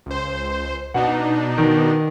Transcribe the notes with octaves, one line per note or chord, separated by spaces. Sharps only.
C#2 C5
B2 D4 D#4 F#5
D#3